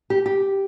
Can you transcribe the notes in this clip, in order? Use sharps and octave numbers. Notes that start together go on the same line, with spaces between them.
G4
G4